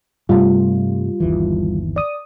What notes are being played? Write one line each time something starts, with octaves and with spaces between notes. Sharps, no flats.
G2 C3 G3 A3 F4
G1 D#2 E3
D5 D#6